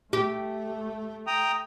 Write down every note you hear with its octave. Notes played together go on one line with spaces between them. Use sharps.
A3 G4
G5 A#5 D#6